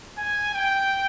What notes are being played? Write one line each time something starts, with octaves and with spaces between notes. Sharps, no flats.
G#5
G5